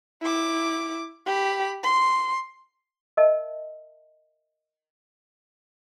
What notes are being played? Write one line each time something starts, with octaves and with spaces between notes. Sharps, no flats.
E4 D6
G4 B5
C6
A#4 D#5 E5 A5